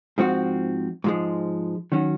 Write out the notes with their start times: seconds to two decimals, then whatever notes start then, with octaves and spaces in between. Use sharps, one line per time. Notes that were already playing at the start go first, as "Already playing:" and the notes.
0.18 G#2 F3 C4 F#4
1.04 G#2 F3 G#3
1.92 D#3 F#3 C#4 F#4